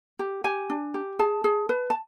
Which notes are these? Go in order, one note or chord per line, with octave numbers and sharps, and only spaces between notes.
G4
G4 G#5
D4
G4
G#4 A5
G#4
B4
A5